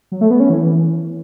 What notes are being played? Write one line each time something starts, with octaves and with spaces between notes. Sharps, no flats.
F#3
A3
B3
C#4
E3